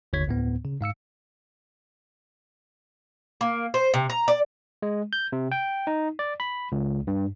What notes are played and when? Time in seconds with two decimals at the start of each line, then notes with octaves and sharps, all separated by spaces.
0.13 G1 D#2 D3 C#5 G#6 B6
0.28 D2 A2 B3
0.65 C#3
0.81 G#2 F5 E6 C#7
3.41 A#3
3.74 C5
3.94 C3
4.10 A#5
4.28 D5
4.82 G#3
5.13 G6
5.32 C3
5.52 G5
5.87 D#4
6.19 D5
6.40 B5
6.72 C#2
7.07 G2